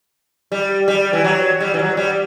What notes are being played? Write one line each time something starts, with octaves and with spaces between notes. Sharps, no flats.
G3
G3
E3
F#3
G3
E3
F#3
G3